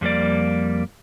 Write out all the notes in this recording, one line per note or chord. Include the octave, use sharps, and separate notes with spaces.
F2 G3 A#3 D5